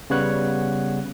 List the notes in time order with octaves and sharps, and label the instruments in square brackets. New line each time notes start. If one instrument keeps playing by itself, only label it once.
[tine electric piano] C#3 G3 B3 C#5 F#5 F#6